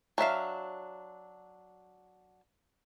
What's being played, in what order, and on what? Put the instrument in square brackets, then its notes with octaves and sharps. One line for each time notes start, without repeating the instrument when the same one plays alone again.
[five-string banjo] F#3 D4 E5 F5